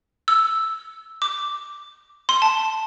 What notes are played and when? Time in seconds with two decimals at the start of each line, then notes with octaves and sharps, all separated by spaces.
0.28 E6
1.22 D6
2.29 C6
2.42 A5